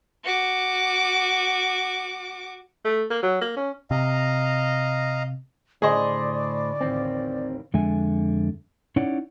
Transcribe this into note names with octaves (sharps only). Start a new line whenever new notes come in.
F#4 D6
A3
A#3
F#3
A#3
C#4
C3 D#5 F5 A#5
A2 D3 G#4 C5 D5 D#5 F#6 G6
A1 D#2 C4
F2 D3 G#3 E5 G#5
C#4 D#4 E4 C#5 D5 F#5